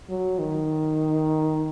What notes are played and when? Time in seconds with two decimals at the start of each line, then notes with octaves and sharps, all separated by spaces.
0.09 F#3
0.39 D#3